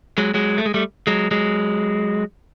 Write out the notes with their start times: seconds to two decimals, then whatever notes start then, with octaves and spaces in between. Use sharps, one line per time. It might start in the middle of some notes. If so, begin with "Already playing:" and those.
0.18 F#3 G#3
0.34 F#3 G#3
0.58 A3
0.66 G#3
0.74 G3 A3
1.07 F#3 G#3
1.31 F#3 G#3